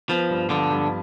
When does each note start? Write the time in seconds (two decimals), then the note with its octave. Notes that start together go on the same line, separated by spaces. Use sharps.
0.09 F3 B3
0.30 G2
0.50 D3 F3
0.70 G2